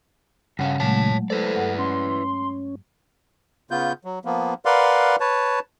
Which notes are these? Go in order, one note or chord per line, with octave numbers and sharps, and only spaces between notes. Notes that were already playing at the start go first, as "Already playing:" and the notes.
G2 C#3 C#4 F5 F#5
A#2 F#3 G#3 A3 C#5 A5
E4 A4 B4 C5 D5
G2 F#5
C#4 C6
C#3 B3 F4 G6
F#3
F3 A#3 B3
A#4 B4 D5 F5 F#5 C6
B4 C#5 A5